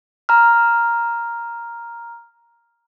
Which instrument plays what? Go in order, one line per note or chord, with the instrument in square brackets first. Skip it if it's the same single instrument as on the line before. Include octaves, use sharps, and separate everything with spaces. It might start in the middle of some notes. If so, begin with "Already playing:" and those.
[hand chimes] A#5 F6